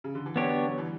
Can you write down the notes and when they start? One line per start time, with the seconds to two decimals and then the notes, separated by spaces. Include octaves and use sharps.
0.04 C#3
0.15 D3
0.26 E3
0.36 D3 F#3 B3 D4 G4 C#5
0.69 F#3
0.78 E3 G3